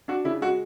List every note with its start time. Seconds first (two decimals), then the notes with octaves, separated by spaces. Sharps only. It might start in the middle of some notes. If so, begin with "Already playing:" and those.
0.08 D4 F#4
0.24 C#3 E4
0.41 G#3 F#4